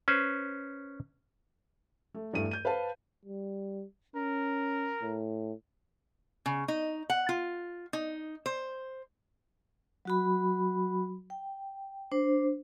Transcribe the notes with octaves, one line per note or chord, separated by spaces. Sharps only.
C#4 B4 C5
A3
E2 G2 A3 D#7
G6 D#7
B4 C5 F5 A5
G3
C#4 A#4
A2
C#3
D#4
F#5
F4
D#4
C5
F#3 F#4 B5
G5
D4 C5